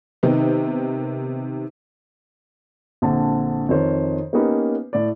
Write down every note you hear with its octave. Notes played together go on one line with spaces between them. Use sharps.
C3 D#3 B3 D#4
A#1 D3 C4 A5
F2 D#3 C5 C#5
A#3 B3 C#4 D#4 G4 B4
A2 D5